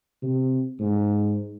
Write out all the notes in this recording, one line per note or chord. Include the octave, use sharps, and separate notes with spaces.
C3
G#2